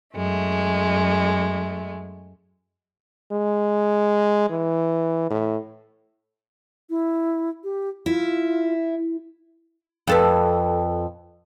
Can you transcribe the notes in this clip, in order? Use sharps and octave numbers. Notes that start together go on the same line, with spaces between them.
F#2 G#3 A3
G#3
E3
A2
E4
G4
E4 F4
F2 A4 B4